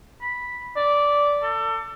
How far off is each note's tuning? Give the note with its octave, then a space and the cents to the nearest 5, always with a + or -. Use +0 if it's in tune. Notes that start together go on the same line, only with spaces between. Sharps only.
B5 -5
D5 -10
A4 +30